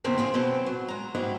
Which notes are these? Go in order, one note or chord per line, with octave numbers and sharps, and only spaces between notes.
E2 A#2 C#3 C4 D4
D3 F4 G#4 C5
B2 F#3 C4
F#3
G#3 A#5
G#2 F#3 G3 D#4 E4